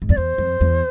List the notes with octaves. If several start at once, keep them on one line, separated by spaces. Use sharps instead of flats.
G#2
F2 D5
E2 C5
F2
E2